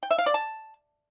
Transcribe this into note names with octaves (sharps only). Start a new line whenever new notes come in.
G5
E5
F5
D5
A5